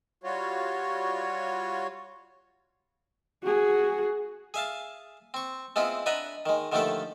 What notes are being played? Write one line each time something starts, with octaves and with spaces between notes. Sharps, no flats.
G3 F4 F#4 C#5
F#4 G#4
G#4 E5 F5 A5
C4 C#6
G#3 B3 C4 E4 F4
D4 B4 D#5 E5 F#5 A#5
D#3 G#3
D3 D#3 F3 A3 G4 A4